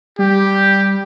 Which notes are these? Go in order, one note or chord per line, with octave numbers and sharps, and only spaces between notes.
G3 G4